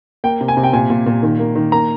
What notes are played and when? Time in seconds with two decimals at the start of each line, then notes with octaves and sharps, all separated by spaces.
0.24 A#3 G5
0.41 C3
0.48 G#5
0.57 C3
0.63 G5
0.73 A#2 G#5
0.90 A#2
1.06 A#2
1.23 D#3
1.39 A#3
1.55 D#3
1.72 A#3 A#5